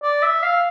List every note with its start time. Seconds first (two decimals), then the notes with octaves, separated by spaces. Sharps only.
0.03 D5
0.23 E5
0.43 F5